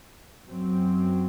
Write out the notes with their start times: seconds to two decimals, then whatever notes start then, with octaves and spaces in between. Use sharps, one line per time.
0.47 F#2 F#3 C4